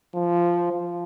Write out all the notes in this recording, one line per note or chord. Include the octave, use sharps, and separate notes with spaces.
F3
F3